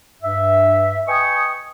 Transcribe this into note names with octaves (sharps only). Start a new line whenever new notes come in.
G2 E5
B4 D#5 G5 G#5 C#6 D#6